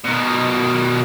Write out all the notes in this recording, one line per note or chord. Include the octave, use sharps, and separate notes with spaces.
B2 D#3